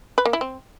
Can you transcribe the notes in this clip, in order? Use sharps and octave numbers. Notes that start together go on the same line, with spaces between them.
B4
A#3
E4
C4